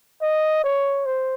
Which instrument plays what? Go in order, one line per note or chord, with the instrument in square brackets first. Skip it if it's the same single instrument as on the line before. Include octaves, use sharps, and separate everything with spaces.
[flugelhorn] D#5
C#5
C5